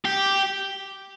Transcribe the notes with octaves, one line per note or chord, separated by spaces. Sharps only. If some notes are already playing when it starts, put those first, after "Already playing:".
G4